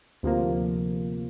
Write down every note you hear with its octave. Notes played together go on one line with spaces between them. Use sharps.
D2 C3 F3 A#3